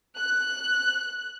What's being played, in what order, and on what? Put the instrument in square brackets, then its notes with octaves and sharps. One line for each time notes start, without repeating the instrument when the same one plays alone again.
[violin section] F#6